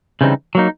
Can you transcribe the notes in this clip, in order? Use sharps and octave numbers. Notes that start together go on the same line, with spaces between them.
C#3 E3 G3 C4 D#4
F#3 A#3 D#4